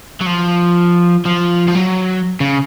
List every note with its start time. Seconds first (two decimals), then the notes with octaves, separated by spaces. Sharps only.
0.21 F#3
0.26 F3
1.25 F3
1.68 F3
1.75 F#3
2.40 C#3